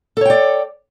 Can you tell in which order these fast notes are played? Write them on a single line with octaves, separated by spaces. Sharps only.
A4 C#5 G5 D5